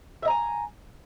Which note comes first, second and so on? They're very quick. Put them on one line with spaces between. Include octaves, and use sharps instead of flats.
E5 D#5 A#5 G#5